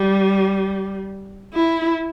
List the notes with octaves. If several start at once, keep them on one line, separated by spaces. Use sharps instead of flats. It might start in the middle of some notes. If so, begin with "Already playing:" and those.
Already playing: G3
E4